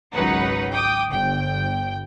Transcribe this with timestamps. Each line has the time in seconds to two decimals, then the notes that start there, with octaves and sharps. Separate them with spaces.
0.13 G#1 C#2 F#3 D#4 B4 F#5
0.72 G5 D6 D#6
1.11 G1 G5